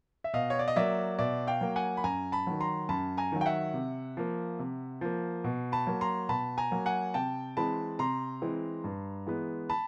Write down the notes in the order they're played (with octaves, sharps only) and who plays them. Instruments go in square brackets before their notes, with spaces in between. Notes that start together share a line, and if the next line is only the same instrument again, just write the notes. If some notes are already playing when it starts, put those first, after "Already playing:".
[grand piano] E5
B2 D#5 F5
C#5
D5
D#5
F#3 A#3 D5 E5
B2 D5 E5
F5 G5
F#3 A#3
F#5 G#5
B5
F#2 G#5 A#5
A5 B5
D#3 F#3
A#5 C6
F#2 A5 B5
G#5 A#5
D#3 F#3
G5
E5 F#5
C3
F3 A#3
C3
F3 A#3
B2
A5 B5
F#3 A#3
A#5 C6
B2 A5 B5
G#5 A#5
F#3 A#3
F#5 G#5
C3 G5 A5
E3 G#3 C4 A5 B5
C3 A#5 C6
E3 G#3 C4
G2
E3 G#3 B3
A5 B5